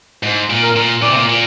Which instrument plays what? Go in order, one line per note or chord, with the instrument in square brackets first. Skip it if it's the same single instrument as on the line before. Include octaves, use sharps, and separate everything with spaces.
[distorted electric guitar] G#2
A#2
[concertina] A#4
[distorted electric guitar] A#2
[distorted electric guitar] A#2 [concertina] D5
[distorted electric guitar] C3
A#2
A#2